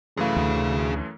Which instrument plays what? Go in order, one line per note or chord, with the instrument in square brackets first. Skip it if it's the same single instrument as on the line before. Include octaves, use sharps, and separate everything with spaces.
[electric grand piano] F#2 E3 A3 [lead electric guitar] G#4 F5
[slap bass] D2